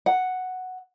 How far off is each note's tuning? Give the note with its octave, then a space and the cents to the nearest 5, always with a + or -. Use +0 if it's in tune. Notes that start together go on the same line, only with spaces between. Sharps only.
F#5 +0